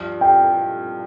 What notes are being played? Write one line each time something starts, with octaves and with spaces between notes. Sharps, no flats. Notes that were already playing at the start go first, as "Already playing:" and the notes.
Already playing: G2 F3
G5